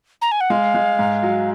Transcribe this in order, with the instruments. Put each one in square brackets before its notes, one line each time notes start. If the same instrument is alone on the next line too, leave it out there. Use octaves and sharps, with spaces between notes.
[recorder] A#5
G#5
F#5
[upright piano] G#3 [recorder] F5
[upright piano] G#3
G#2
F#3